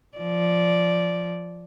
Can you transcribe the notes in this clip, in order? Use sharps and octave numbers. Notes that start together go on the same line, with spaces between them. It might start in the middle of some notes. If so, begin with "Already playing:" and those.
F3 D5